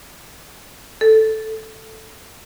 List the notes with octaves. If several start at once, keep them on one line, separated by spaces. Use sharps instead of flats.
A4